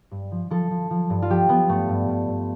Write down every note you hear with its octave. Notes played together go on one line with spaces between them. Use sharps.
G2
F3
F3 A4
F3
F3
G2
F4
F3 G4
F3 B3
G2 A3
G2
G2
G2